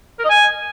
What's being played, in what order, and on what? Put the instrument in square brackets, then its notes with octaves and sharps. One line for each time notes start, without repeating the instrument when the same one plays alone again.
[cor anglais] A#4
D#5
G#5